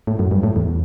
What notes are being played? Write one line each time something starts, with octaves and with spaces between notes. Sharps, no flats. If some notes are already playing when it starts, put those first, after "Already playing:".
A2
F#2
G2
A2
E2